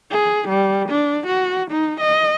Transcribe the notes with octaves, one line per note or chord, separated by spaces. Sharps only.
G#4
G3
D4
F#4
D#4
D#5